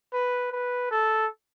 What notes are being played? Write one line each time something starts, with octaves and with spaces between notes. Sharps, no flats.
B4
B4
A4